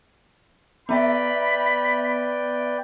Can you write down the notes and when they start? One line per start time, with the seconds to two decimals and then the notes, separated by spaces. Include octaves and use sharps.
0.89 B3 B4 D5 E5 G5 B5